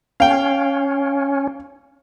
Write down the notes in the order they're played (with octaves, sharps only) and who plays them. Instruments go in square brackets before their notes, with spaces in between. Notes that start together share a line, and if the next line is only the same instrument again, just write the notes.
[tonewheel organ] C#4 [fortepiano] F5 G5